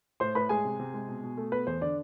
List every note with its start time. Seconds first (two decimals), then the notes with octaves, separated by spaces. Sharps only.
0.20 A2 C5 C6
0.35 A2 B4 B5
0.49 G#3 G#4 G#5
0.65 C3
0.79 C3
0.94 G#3
1.08 B2
1.24 B2
1.37 A3
1.52 B3 B4
1.67 E2 C5
1.81 D3 D4 D5